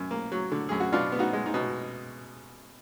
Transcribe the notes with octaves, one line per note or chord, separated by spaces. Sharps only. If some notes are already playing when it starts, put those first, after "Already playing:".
Already playing: F#2
A#3
F#3
D3
F#2 G#4
F#4
B2 D4 F4
B3
D#4 F#4
G#3
D#4
B2